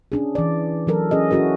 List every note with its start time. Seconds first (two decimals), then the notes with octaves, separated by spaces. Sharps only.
0.12 C#4 D4 G#4
0.35 E3 D5
0.87 E3 F#3 A4 A#4
1.11 C#4 G#4 D#5
1.31 C#4 E4 F#4 G#4 A#4